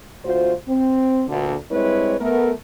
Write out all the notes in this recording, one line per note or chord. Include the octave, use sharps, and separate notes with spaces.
D2 F4 F#4 C5
C4
D2 A#2 D3
G2 G#3 C4 E4 B4 C#5
A3 B3 A#4